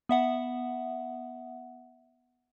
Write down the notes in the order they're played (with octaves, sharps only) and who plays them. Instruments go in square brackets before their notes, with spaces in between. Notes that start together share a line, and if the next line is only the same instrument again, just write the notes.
[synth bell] B3 E5 F#5